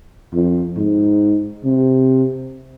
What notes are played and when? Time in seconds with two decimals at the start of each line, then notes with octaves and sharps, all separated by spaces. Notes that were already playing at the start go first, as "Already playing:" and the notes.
0.33 F2
0.77 G#2
1.64 C3